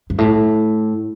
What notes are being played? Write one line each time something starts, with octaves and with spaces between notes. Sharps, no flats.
G2
A2